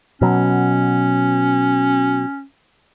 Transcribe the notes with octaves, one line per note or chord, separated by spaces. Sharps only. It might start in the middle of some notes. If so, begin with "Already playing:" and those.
B2 F#3 C#4